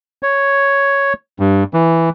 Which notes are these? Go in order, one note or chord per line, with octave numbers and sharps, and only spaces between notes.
C#5
G2
E3